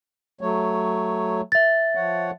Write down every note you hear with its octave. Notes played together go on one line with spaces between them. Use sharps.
F#3 A3 C#5
E5 A6
F3 C#5 F#5